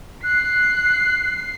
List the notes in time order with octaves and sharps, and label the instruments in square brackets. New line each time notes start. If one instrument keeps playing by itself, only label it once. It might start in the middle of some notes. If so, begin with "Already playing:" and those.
[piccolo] F#6 [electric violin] C7